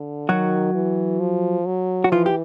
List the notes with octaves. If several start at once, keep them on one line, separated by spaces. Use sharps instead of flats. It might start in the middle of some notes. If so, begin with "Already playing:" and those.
Already playing: D3
D#3 F#3 F#4
E3
F3
F#3
F#4
E3 F3 F4
G4